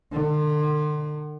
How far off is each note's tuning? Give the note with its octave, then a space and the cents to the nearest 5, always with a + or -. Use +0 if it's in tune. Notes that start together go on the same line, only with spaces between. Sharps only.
D3 +40